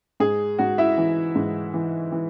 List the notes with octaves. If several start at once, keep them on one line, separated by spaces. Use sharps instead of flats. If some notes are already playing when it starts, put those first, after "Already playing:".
G#2 G#4
G#2 F#4
E4 E5
E3
G#2
E3
E3